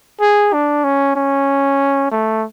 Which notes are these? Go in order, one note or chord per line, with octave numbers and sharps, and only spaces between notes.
G#4
D4
C#4
C#4
A3